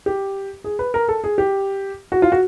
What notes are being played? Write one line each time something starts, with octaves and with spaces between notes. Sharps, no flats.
G4
G#4
B4
A#4
A4
G#4
G4
F#4
F4
F#4